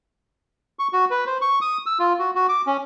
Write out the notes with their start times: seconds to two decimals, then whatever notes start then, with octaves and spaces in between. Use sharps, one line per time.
0.79 C#6
0.93 F#4
1.11 B4
1.27 C5
1.41 C#6
1.61 D#6
1.86 E6
1.99 F4
2.19 F#4
2.35 F#4
2.49 D6
2.67 C#4